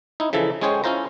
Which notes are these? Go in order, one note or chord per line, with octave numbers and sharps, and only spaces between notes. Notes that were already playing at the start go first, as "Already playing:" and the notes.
D#4 E4
C#3 E3 F3 A4
G#3 C#4 G#4 C5 C#5 G5
C#4 E4 F4 C5 A#5